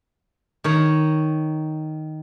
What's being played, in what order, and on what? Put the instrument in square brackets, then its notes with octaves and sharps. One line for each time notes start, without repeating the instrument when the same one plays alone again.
[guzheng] D#3 C#5 A#5